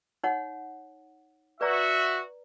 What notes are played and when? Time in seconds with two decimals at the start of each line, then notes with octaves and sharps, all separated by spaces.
0.23 D#4 C#5 F#5
1.61 F#4 B4 D5 E5 A#5